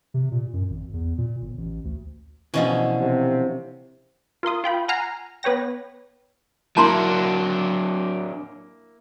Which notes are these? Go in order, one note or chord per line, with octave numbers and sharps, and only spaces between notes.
C3
A#2
F#2
G#1
E2
A#2
G1
A1
D2
B2 D3 E3 F3 A#3 C#4 D#5
C3
F4 A#4 C6 D#6
F4 G5 B5
F#5 G#5 A#5 F6 C7
B3 B4 C#5 G5 A#6
F#3 A#3 D4 E4 A5 A#5 C6